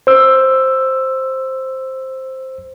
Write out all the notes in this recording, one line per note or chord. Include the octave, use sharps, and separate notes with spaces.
C5 E6